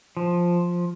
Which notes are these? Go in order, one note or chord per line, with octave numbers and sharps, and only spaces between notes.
F3